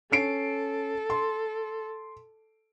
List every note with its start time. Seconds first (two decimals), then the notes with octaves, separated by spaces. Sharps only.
0.12 C#4 A4 C7 D7
1.10 C6